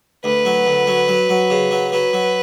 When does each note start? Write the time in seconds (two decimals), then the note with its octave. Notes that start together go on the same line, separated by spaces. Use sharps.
0.24 D2 B4
0.45 F#3
0.67 D2
0.87 F#3
1.08 F#3
1.29 F#3
1.50 C#3
1.71 F#3
1.92 F#3 B4
2.13 F#3